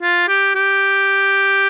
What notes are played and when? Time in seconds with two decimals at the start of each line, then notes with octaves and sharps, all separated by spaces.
0.02 F4
0.28 G4
0.55 G4